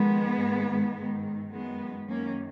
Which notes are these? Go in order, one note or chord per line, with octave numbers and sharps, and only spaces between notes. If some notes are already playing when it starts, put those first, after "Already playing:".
Already playing: F2 D#3 G#3 B3
G#2 D#3
G#2 D#3
F#2 D#3 G#3 B3
F#2 D#3 A#3 C#4